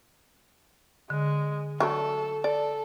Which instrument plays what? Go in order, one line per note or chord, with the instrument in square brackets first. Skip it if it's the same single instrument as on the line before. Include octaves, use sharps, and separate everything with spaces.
[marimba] D3 [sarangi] G#3
[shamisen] F#3 A3 D4 [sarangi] A4
[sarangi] A4 [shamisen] D5